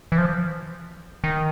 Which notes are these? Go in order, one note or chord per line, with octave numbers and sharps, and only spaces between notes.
E3
F3
D#3